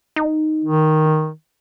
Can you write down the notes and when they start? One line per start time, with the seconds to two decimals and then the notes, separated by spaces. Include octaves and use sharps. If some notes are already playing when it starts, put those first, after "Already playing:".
0.16 D#4
0.64 D#3